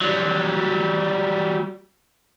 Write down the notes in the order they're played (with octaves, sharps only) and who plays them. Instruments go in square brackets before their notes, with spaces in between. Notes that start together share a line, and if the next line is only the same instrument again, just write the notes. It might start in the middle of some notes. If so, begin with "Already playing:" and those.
[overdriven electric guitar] F#3 G3